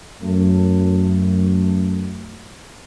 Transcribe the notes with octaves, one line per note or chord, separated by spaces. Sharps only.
F#2 A3